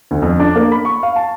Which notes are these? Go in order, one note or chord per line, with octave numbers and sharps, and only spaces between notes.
D2
F2
D4
A#3
B5
C#6
F5
A5